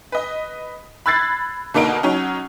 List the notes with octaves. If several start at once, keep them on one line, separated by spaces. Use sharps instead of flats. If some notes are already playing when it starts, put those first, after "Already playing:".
B4 D#5
B5 E6 F#6 G#6 A6 C7
B2 D3 A#3 D#4 D7
F#3 C#4 D#4